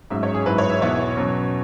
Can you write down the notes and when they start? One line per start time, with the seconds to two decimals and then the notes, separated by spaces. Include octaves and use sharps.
0.10 G#2 F#3 C#4 E5
0.23 C#5
0.34 G#4
0.46 G#2 F#3 E4 B4
0.58 C#5
0.69 E5
0.81 E2 B2 B3 E4 C#5
1.17 B2 F#3 C#4